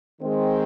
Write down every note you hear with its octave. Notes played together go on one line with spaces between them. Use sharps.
D#3 G#3 C4